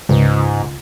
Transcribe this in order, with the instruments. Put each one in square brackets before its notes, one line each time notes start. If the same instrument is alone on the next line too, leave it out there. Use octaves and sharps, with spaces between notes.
[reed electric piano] C#2 [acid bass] G#2